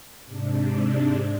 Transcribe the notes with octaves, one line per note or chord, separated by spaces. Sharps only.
G#2 C3 D4